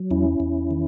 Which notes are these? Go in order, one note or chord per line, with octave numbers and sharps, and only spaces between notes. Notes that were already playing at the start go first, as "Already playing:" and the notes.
Already playing: F#3
E2 C#4 E4
E2
D#3